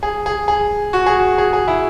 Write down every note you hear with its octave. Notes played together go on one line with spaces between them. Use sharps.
G#4
G#4
G#4
F#4
G#4
F#4
G#4
G#4
E4